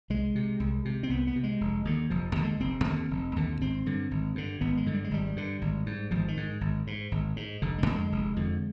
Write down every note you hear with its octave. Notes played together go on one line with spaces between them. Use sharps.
C2 G#3
C3
C2
C3
C4
C2 B3
B3
C3
G#3
F1
D#2 D3
F1 F3
D#2 D3
G#3
F1 C4
D#2 D3
F1
D#2 D3
G#1 C4
G2 D3
G#1
G2 D3
G#1 B3
G#3
G2 D3
G3
G#3
G#1 G3
G2 D3
G#1
G#2
G#1 F3
D#3
G#2
G#1
G#2
G#1
G#2
F1 D3
G#3
F2 D3
G#3
F1
F2 D3